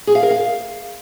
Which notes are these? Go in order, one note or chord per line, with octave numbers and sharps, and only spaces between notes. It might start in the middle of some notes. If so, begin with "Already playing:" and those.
G#4
F5
A#4
F5